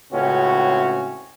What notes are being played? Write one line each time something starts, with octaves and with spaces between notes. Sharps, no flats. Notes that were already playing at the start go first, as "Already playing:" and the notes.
C#2 A2 C#3 C4 C#4 F#4